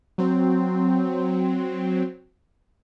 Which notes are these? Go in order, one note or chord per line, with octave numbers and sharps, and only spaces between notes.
F#3 C4